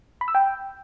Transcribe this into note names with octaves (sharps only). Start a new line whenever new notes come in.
B5
E6
G5